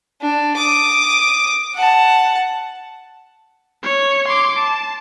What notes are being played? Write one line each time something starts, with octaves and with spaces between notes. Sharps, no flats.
D4
D6 D#6
F#5 A5
C#5
C6 D6
A5